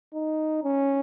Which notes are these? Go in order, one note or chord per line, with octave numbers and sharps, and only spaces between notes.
D#4
C#4